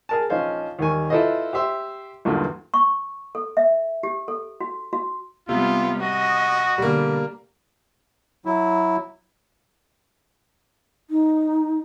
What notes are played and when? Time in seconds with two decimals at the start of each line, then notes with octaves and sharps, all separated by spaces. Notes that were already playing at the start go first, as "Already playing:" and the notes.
0.09 G#4 A#4 A5
0.30 A#1 C#4 D#4 C5 F5
0.79 D#2 D#3 G3 A#4 G#5 C#6
1.10 E4 F4 A4 B4 C5 D#5
1.53 G4 C5 E5 C6
2.25 B1 E2 G2 D3 A#3 F4
2.74 C#6
3.35 A4
3.57 E5
4.03 G4
4.28 A4
4.61 F#4
4.93 F#4
5.49 C3 G3 B3 F4
6.03 F#4 D#5
6.78 B2 D3 G3 A#3
8.45 F#3 E4
11.10 D#4